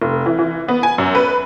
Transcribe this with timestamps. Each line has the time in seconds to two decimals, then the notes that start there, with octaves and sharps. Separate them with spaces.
0.02 F1
0.26 E3
0.39 E3
0.68 B3
0.83 G#5
0.98 F#2
1.15 B4